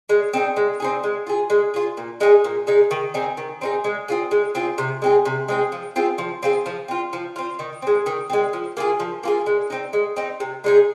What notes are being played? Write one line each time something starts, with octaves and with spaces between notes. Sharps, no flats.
G#3
C4 D#4 G#4
G#3
C4 D#4 G#4
G#3
F4 G#4
G#3
F4 G#4
A#2
G#3 D#4 G#4
A#2
G#3 D#4 G#4
D#3
C4 D#4 G#4
D#3
C4 D#4 G#4
G#3
C4 F4 G#4
G#3
C4 F4 G#4
C3
G#3 C4 G#4
C3
G#3 C4 G#4
F3
C4 F4 G#4
F3
C4 F4 G#4
F3
C4 F4
F3
C4 F4
D#3
G#3 C4
D#3
G#3 C4
F3
A#3 F4 G#4
F3
A#3 F4 G#4
G#3
C4 D#4
G#3
C4 D#4
C3
G#3 D#4 G#4